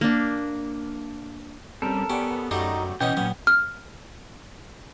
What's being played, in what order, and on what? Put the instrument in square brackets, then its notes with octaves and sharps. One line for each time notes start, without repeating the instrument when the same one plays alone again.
[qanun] A#3 D4
[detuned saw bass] G3 [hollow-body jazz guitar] C4 C#4 [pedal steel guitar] A4 A#4
[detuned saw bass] B3 [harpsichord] C#4 [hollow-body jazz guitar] G4 D5
[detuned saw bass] F#2 [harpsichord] F#3 G3 A3 [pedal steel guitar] D#4
[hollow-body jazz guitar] B2 [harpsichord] E3 B3 D#4 [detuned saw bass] C#4 [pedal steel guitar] G5
[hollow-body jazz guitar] A#2 F#3 [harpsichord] B3
[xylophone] F6